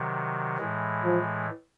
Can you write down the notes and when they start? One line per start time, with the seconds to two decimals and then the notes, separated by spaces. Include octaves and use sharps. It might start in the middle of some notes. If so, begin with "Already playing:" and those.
Already playing: C3 D#3 F#3
0.57 A2 E3 G#3
1.04 F3